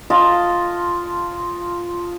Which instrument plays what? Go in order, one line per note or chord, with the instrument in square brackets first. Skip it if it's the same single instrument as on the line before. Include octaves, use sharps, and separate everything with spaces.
[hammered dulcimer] F4 D#5 A5